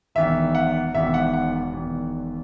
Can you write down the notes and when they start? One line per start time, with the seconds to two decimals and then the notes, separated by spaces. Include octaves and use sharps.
0.15 E1 E2 D#3 E5
0.55 F#5
0.94 E1 E2 D#3 E5
1.14 F#5
1.34 F#5
1.73 E1 E2 D#3